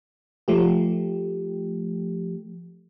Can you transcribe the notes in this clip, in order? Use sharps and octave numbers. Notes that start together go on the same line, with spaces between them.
F3 A3 G4